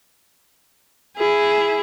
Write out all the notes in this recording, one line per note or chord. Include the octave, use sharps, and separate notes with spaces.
E4 G#4